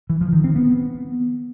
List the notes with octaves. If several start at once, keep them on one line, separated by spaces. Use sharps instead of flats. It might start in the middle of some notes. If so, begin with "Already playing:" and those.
E3
F3
D#3
C4
B3